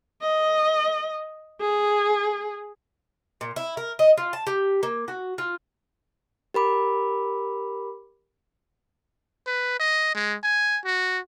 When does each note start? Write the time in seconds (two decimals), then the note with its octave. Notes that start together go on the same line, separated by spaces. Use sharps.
0.22 D#5
1.61 G#4
3.41 A#2
3.56 E4
3.77 A#4
3.99 D#5
4.17 F4
4.33 A5
4.47 G4
4.83 A#3
5.08 F#4
5.38 F4
6.54 G4 A#4 B5 D6
9.47 B4
9.80 D#5
10.15 G#3
10.44 G#5
10.85 F#4